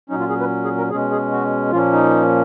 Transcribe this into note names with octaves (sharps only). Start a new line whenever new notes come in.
A#2 F#3 C#4 D#4
F4
G#4
B4
G#4
A#4
B2 G#3 C#4 G#4
G#4
F#4
A#2 F3 A#3 C#4 F4
D#4